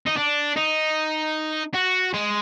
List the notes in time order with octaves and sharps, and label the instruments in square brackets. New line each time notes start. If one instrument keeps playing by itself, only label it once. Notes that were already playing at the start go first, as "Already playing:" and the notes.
[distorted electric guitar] D#4
D4
D#4
F#4
G#3